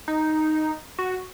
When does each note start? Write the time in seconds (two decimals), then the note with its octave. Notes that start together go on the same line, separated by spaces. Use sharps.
0.08 D#4
0.98 F#4